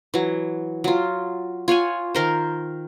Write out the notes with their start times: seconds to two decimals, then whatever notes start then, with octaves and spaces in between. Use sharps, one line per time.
0.14 E3 F#3
0.84 F#3 F4
1.68 F4 C#5 F#5 G#5
2.15 D#3 A#4 C5